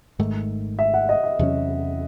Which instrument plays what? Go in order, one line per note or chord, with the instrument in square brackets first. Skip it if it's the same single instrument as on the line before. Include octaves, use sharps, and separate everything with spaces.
[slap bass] G#1 G#2 D#3 A3
[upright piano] E5
F#5
D#5
E5
[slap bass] E2 C3 F#3 C#4